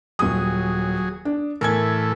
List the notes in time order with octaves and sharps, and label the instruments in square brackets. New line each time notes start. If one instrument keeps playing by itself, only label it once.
[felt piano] D#1 D#6 [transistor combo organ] F#3 G#4
[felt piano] D4
[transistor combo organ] A2 E3 A3 [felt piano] A#4 G#5 G#6